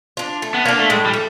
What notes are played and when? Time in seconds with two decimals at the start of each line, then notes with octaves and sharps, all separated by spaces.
0.17 D4 F4
0.42 A3
0.54 B3
0.65 A#3 D4 F4
0.78 A3
0.89 A2 G#3
1.06 G3
1.14 A3